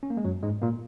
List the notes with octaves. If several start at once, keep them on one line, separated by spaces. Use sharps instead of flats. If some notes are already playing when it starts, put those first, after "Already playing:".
C#4
A#3
G#3
F#2 F#3
G#2 G#3
A#2 A#3